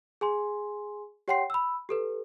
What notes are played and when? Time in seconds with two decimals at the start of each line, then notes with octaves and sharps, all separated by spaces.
0.21 G#4 G#5 C6
1.28 G4 C#5 F#5 G5 C6 C7
1.50 B5 E6
1.89 G4 A4 B4